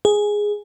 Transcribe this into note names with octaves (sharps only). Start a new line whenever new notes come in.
G#4